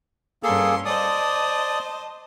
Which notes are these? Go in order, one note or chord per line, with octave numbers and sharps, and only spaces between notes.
G2 A#3 C#4 G#4 A4 C6
C5 D5 D#5 A5 D#6